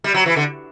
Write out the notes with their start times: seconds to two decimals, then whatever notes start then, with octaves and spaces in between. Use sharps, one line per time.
0.04 G3
0.14 F#3
0.26 E3
0.36 D3